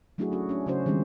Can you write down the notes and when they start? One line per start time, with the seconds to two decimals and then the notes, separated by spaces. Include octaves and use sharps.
0.18 F#3 A3 D4 E4 F#4 G#4
0.32 C#4 F#4
0.49 C#4 D4
0.66 C#3 F#3 C#4 F#4 C5
0.86 D#3 G3 G#3 C4 C#4